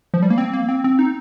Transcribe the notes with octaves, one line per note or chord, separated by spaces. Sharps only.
F3
G3
A#3
C4
A#3
C4
C4
D#4